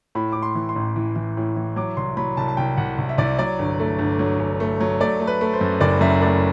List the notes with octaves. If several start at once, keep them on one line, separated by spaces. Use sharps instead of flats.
A2 B5
A2 D6
C6
E3
C6
A1
E3
E3
A2
E3
F#3 D6
C2 C6
F#3 B5
C2 A5
A5
C2 G5
C2 F#5
C2
E5
C2 D5
F#3 D5
G1
A3
G1
F#3
G1
A3
F#3
A3 D5
A3
B4
A3
C5
F#2
F#1 D5
F#2 E5
A3 D5